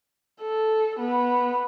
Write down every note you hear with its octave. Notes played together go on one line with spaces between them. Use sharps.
A4
B3